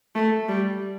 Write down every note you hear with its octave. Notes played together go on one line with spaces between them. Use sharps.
A3
G3